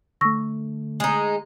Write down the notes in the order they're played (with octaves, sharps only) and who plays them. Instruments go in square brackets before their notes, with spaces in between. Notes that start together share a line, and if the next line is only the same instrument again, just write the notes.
[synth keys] D3 A3 [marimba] C#6 E6 A#6
[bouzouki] G#3 D#4